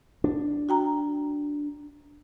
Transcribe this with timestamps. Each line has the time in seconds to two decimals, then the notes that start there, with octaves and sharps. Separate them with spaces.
0.24 D4
0.69 F#4 G5 A#5